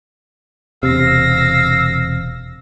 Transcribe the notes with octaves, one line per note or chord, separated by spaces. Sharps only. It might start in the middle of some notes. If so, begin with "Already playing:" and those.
E1 C3 F5 E6 A#6